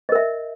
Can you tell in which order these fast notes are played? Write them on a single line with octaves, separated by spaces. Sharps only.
D#5 A#4 E5